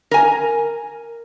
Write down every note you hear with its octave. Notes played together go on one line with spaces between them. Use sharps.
A#4 G#5